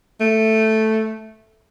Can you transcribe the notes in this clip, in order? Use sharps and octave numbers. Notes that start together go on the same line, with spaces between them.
A3